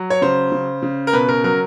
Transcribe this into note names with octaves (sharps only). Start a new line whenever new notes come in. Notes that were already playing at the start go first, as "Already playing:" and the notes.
Already playing: F#3
C#5
C#3 C5
C#3
C#3
A#4
B2 B4
A#4
F#3 A#4